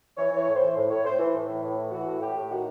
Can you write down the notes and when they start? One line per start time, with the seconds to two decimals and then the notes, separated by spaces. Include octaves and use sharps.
0.17 E3 C#5
0.32 E3
0.37 C#5
0.47 A2
0.56 C5
0.61 E3
0.76 A2
0.90 A2 C#5
1.04 A2 C5
1.19 E3
1.34 A2
1.48 E3
1.62 A2
1.77 E3
1.91 E3 F#4
2.07 A2
2.21 A2 G4
2.35 A2
2.49 D#3 F#4